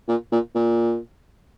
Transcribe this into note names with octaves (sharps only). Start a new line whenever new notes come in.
A#2
A#2
A#2